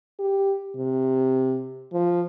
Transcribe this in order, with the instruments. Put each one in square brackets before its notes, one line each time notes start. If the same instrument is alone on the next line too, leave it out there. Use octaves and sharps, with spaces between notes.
[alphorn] G4
C3
F3